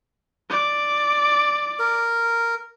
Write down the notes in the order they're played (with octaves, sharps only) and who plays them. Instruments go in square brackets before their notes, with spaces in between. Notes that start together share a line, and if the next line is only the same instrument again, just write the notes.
[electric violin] D5
[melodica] A#4